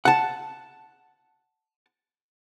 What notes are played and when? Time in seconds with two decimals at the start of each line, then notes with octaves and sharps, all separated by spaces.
0.05 F#5 A5